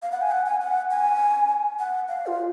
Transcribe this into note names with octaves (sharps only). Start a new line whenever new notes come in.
F5
F#5
G#5
F#5
G#5
F#5
G#5
F#5
F5
F4